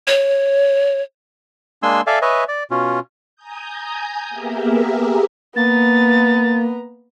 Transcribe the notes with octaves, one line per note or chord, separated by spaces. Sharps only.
C#5
G#3 A#3 D4 G#5 C6 E6
A4 D5 E5 F5 G#5
B4 C#5 D#5 E5 G#5
D5
B2 C#4 F4
G#5 A#5 D#6 G6
A#3 B3 G4 G#4 A#4 E5
A#3 B3 A#5 A6